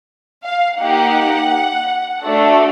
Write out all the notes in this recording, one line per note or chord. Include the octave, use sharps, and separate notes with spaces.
F5
A#3 D#4 G4 F#5
A3 D4 F#4 A4